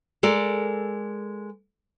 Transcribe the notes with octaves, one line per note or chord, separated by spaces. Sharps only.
G#3 A4 A#4 D5